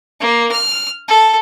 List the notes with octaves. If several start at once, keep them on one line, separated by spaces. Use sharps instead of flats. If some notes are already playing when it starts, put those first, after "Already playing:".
A#3
F6
A4